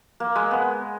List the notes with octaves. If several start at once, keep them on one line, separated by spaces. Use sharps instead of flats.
A#3
G#3
B3